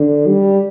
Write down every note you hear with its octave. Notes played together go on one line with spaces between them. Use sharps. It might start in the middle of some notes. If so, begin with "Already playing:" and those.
Already playing: D3
G3